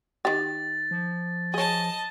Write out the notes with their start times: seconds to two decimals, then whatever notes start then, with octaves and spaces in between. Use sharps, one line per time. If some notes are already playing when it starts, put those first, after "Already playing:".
0.25 D#3 G4 A6
0.91 F3
1.54 G#4 C#5 D#5 A5